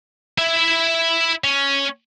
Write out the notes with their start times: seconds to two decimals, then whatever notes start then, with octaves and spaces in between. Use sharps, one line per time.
0.38 E4 E5
1.44 C#4